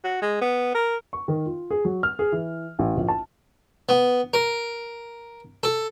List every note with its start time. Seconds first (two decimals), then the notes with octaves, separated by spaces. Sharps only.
0.04 F#4
0.22 G#3
0.41 B3
0.74 A#4
1.13 C#6
1.28 D#3
1.46 F4
1.71 G#4
1.85 F#3
2.03 F6
2.19 G#4
2.32 E3
2.79 A1
2.97 A#1
3.08 A5
3.89 B3
4.34 A#4
5.63 A4